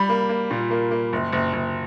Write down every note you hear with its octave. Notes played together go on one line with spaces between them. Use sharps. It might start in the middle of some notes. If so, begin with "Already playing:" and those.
Already playing: G3 B5
A#3
A#3
A#2
A#3
A#3
F#1
F#1
F#1